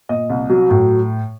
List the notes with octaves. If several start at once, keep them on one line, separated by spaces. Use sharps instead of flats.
A#2 D#5
C2
F#3
A2